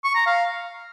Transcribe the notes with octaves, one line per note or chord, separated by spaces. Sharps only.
C#6
A#5
F5